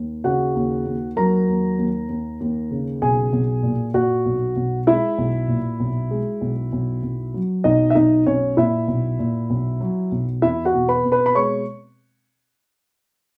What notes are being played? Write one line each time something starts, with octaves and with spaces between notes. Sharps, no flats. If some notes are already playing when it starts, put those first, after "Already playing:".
Already playing: D#2
C#3 F#4 F#5
D#2
D#2
F#3 A#4 A#5
D#2
D#2
D#2
D#2
C#3
B1 G#4 G#5
B1
A#2
A#2 F#4 F#5
B1
B1
G#3 E4 E5
B1
A#2
B1
G#3
B1
B1
B1
F#3
B1 D#4 D#5
E5
B1 D#4 D#5
B1 C#4 C#5
A#2 E4 E5
B1
A#2
B1
F#3
B1
E2 E4 E5
F#4 F#5
B2
B4 B5
B2
B4 B5
B5
G#3 C#5 C#6